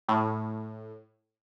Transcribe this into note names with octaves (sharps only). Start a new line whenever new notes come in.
A2